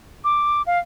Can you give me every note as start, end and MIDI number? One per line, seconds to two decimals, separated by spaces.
0.24 0.62 86
0.67 0.79 77